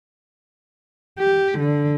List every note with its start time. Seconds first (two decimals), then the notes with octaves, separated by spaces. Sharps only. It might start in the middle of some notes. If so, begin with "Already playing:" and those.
1.19 G4
1.59 D3